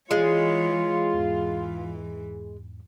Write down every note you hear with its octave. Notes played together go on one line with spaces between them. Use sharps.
E3 G#3 F4 C#5
E2 G#2 E3